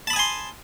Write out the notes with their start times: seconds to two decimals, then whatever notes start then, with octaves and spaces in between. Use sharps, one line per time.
0.07 A5
0.10 B5
0.13 D#6
0.16 G#5
0.19 C6